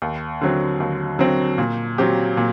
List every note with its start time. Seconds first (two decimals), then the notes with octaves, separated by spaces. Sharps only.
0.02 D#2
0.42 D3 F#3 C4
0.80 D#2
1.19 D3 F#3 C4
1.58 A#2
1.98 F#3 C4 G4
2.37 A#2